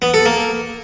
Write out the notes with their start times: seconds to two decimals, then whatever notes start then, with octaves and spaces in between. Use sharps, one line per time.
0.02 B3
0.14 A4
0.26 A#3